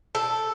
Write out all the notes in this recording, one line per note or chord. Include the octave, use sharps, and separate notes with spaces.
A4